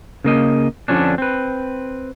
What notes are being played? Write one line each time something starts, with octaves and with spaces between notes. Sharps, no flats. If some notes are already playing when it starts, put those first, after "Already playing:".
C#3 A#3 D#5
F2 D3 F3 C#4 D4
C4 B4